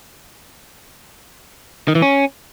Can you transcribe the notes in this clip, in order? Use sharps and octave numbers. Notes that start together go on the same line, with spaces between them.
D#3
E3
C#4